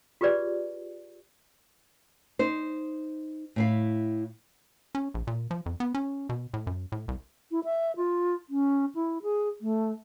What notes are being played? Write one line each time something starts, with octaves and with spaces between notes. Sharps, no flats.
F4 G4 G#4 B4 D5
D#4 C5
A2 E4 F5
C#4
A#1
A#2
F3
F2
B3
C#4
B2
A2
F#2
A2
C2
E4
E5
F4
C#4
E4
G#4
A3